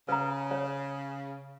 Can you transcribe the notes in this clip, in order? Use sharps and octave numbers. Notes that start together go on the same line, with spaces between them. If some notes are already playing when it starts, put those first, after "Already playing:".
C#3 B4 A#5
C#5